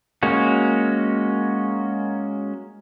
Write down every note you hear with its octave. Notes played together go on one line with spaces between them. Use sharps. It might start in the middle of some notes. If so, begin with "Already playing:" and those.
G#3 A#3 C#4 F#4